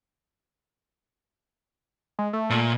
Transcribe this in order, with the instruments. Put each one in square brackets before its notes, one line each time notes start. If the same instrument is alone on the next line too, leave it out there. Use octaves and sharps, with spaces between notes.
[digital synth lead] G#3
A3
[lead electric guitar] A#2